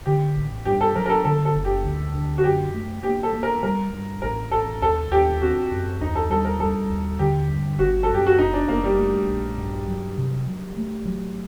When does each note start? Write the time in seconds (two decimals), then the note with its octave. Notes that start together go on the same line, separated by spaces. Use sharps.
0.06 D3 G4
0.36 A1
0.65 G2 G4
0.81 A4
0.95 F#3 A#4
1.06 A#4
1.10 A4
1.25 D3 A4
1.45 A4
1.55 F#1
1.65 G4
1.84 D2
2.14 D3
2.38 F#4
2.43 F#2 G4
2.74 A3
3.03 A#3 G4
3.23 A4
3.33 A#3
3.43 A#4
3.63 G3 A#4
3.93 G2
4.22 A1 A#4
4.51 A1 A4
4.82 D#2 A4
5.11 D#2 G4
5.42 C4 F#4
5.72 F#2
6.01 D#2 D#4
6.15 A4
6.30 G3 A4
6.45 A#4
6.60 G3 A4
6.90 D#2
7.19 D3 G4
7.49 G2
7.78 G1 F#4
8.03 A4
8.09 F#2
8.14 G4
8.27 F#4
8.38 F#1 D#4
8.53 D4
8.68 F#1 A#3
8.84 G3
8.97 A3
9.27 A#1
9.58 G2
9.88 F#3
10.17 C3
10.46 F#3
10.77 A3
11.05 F#3